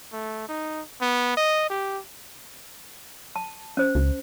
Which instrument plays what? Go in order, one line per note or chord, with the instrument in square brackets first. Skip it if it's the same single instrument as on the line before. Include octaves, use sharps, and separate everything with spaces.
[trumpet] A3
D#4
B3
D#5
G4
[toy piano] A5
C#4 C5
[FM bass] C#2